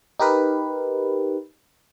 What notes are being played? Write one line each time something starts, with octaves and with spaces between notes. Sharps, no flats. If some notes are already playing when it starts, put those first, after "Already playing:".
D#4 G4 A#4 B4